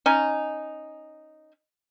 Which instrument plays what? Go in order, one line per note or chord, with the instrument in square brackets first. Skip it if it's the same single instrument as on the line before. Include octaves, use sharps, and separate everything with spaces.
[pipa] C#4 D#4 G#5